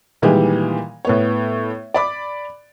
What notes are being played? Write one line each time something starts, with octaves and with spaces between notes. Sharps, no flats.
A#2 D#3 E3 G3 G#3
A2 B3 C#5
D5 B5 D6